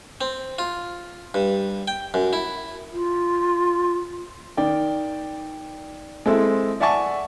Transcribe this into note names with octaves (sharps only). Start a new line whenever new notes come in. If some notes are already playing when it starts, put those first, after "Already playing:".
C4
F4
G2
G5
F#2
E4
F4
D#3 D5 G5
G#3 C4 E4 A4
D5 E5 F#5 G#5 A5 C#6